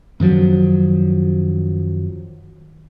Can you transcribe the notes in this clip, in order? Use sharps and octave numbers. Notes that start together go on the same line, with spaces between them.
F#2 D#3 F3 F#3